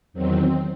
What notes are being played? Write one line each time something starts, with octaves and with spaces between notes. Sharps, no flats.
E2 D#3 F#3 C4